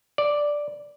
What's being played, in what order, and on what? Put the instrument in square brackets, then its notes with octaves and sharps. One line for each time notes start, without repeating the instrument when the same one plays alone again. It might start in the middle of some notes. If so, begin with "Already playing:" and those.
[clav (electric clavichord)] D5